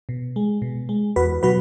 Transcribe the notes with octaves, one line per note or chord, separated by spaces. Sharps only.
B2
G#3
B2
G#3
E2 F#4 B4
B2 F#3 F#4 B4